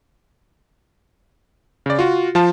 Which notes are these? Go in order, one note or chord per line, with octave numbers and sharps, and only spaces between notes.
C#3 D5
F4 F#4
F3 F4 A5